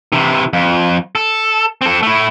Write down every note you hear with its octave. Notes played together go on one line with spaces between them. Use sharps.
C3 E3
F2
A4
C4 A4
A3 E4